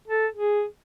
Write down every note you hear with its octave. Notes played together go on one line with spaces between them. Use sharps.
A4
G#4